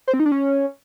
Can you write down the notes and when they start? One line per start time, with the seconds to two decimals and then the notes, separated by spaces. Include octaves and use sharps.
0.07 C5
0.14 C4
0.20 D#4
0.26 D4
0.32 C#4